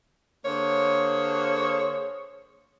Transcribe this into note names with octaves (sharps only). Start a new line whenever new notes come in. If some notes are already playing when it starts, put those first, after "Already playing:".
D3 A#3 G#4 C5 C#5